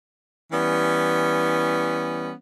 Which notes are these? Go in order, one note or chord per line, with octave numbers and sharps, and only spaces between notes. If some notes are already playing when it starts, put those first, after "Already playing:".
E3 G3 B3 C#4